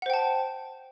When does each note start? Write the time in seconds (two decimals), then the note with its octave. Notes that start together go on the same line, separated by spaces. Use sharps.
0.02 F#5
0.06 C5
0.10 G5
0.14 A5